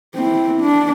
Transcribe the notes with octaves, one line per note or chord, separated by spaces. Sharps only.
C4 E4
D4